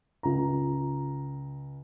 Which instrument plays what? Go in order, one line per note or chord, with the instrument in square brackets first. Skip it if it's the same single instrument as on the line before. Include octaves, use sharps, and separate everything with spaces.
[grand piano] C#2 A#5